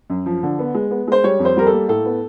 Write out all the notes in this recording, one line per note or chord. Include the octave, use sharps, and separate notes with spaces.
F#2
F3
D3
B3
G#3
B3
G#3 C5
G3 C#5
F2
C5
G3 A#4
A4
A#3
A2 A4
B3